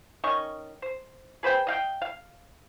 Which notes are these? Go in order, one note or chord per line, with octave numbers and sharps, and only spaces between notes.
D#3 C#4 D#5 C#6
C5
G#4 B4 C5 G5
D#5 F5 G5
F5